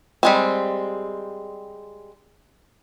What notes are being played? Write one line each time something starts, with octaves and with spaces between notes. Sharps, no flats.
G3 G#3 C4